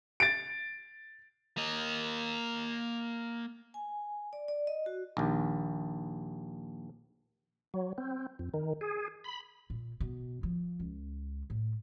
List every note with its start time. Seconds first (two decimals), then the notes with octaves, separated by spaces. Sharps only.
0.20 A6 D7
1.58 A#3 D#5
3.74 G#5
4.33 D5
4.48 D5
4.67 D#5
4.86 F#4
5.17 A#1 D#2
7.74 F#3
7.98 C4
8.39 F2
8.54 D#3
8.81 G#4
9.24 B5
9.70 A#2
10.00 B2
10.43 F3
10.80 C#2
11.50 A2